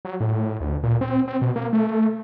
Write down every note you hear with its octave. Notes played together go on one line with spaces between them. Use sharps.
F#3
A2
D2
A#2
C4
C4
B2
A#3
A3